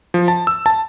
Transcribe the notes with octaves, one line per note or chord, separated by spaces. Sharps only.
F3
A5
E6
A5